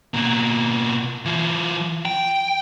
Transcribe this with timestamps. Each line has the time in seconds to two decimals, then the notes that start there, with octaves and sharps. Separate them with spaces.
0.14 B2 A#3
1.25 E3 F4
2.05 G5